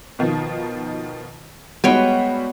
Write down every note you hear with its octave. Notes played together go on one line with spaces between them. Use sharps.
B2 D#3 F3
G3 G#3 B3 F#4 C#5 G5